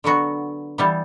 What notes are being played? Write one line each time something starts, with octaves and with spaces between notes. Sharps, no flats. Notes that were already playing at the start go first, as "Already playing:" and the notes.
D3 F#3 B3 F#4
E3 G3 B3